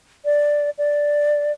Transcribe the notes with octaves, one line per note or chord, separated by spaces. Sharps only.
D5
D5